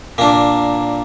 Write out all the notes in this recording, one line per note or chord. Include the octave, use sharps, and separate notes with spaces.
A#2 A#3 D4